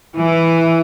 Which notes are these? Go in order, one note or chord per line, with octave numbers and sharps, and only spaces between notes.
E3